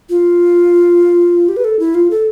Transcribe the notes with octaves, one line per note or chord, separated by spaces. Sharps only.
F4
G4
B4
A4
E4
F4
A4